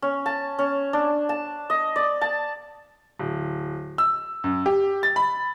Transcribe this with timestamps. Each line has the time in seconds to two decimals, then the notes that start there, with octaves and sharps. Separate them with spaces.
0.02 C#4
0.26 A5
0.59 C#4
0.93 D4
1.29 A5
1.70 D#5
1.96 D5
2.21 A5
3.19 D1
3.98 E6
4.44 F#2
4.66 G4
5.03 A6
5.16 B5